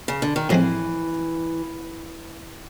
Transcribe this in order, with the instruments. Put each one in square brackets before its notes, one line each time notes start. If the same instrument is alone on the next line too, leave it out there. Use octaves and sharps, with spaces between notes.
[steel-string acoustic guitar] C#3
D3
D#3
[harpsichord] A2 F3 G#3 C4 [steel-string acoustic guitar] E3